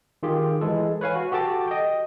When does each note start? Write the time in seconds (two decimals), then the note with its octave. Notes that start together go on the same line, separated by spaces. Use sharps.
0.23 D#3 F4 G4 G#4
0.61 E3 G#3 A4
1.01 B4 C#5 F5 G#5
1.15 F#4
1.32 F#4 G4 A4 A5 D6
1.68 D#5 G5